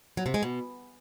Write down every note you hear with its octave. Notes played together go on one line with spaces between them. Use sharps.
F#3
C3
G#3
B2